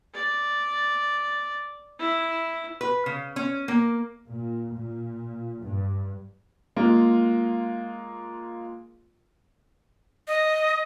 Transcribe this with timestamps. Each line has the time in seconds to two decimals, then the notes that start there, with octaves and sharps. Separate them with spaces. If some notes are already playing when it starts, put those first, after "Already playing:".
0.14 D5
1.99 E4
2.81 B4
3.06 C#3
3.36 C#4
3.68 A#3
4.29 A#2
4.76 A#2
5.62 G2
6.77 G#3 A#3 F4
10.27 D#5